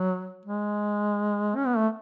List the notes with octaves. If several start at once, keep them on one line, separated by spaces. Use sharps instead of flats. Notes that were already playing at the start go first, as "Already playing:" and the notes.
Already playing: F#3
G#3
C#4
B3
A3